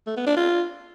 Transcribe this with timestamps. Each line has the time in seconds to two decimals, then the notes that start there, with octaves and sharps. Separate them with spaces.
0.07 A3
0.16 B3
0.26 D4
0.36 F4